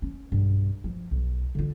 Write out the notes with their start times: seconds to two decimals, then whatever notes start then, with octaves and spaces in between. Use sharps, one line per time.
0.02 C#4
0.32 B1 G2
0.84 F3
1.11 B1
1.55 D3 F4